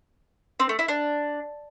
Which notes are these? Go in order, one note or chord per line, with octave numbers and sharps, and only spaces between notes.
C4
A3
E4
D4